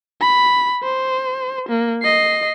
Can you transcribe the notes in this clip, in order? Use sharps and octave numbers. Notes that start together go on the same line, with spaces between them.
B5
C5
A#3
D#5 C7